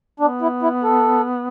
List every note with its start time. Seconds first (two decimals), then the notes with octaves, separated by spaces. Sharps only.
0.20 B3 D4
0.41 E4
0.62 E4
0.83 A4